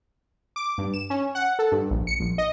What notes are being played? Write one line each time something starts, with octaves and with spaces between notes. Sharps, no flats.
D6
G2
E7
C#4
F#5
A4
G2
A#1
C#7
A#1
D#5